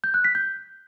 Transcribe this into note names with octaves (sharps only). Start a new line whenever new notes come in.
G6
F#6
B6
G6